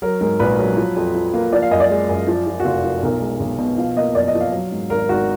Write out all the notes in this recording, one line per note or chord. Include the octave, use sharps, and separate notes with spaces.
F#3 A#4
G#2 A#4
A#1 B4
F#3
F3
F2
F3
A#3
F3 D5
F5
F#2 D#5
D5
G#3
F#2
F3
F3
F#4
F1 F4
F3
B1 A#4
G#3
B1
B2
F3 F5
A#3 D#5
F#2 D5
D#5
F3
F5
F#3
G#2
G#1 A#4
G#1 F#4